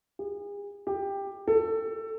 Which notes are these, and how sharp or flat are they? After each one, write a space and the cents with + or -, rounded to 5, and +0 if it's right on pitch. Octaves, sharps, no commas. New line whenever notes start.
G#4 -40
G4 +15
A4 +20